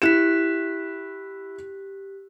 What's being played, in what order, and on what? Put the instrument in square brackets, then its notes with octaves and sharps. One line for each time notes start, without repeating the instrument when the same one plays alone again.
[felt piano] E4 E7 [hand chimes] G4 F#6 B6